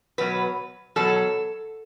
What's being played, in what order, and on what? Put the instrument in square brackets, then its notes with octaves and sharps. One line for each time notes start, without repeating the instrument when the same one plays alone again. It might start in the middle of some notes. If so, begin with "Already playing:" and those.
[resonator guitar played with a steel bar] B2 F#3 B4
B2 F#3 A4